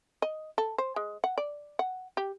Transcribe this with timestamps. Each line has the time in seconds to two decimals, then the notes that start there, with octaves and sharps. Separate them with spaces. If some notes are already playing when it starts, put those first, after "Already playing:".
0.22 D#5
0.58 A4
0.78 C5
0.96 G#3
1.24 F#5
1.38 D5
1.79 F#5
2.17 G4